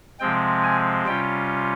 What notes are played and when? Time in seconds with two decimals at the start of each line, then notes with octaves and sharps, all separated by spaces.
0.20 C3 F3 G#3 C4 G5
0.64 G#5
1.07 C3 G3 C#4 F4 G5